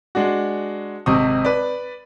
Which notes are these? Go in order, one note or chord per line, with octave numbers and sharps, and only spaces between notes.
G#3 D4 F#4
G#1 C3 C4 D#5 C#6 D#6
B4 D5